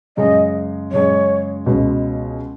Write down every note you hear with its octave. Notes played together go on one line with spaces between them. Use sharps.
F#2 C#3 G#3 D#5
F#2 C#3 G#3 C#5
C#2 B2 G#3